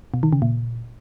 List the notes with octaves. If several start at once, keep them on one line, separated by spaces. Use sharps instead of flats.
B2
D#3
C#3
A#2